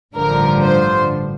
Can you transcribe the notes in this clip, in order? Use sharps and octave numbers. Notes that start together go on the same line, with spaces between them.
A1 G2 D3 F3 A#4
C5